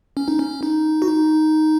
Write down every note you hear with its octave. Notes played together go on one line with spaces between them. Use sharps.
C#4
D#4
C#4
D#4
F#4
D#4